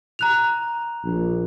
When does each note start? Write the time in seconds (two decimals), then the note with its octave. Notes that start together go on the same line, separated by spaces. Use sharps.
0.19 A#5 F#6 F7
1.04 A#1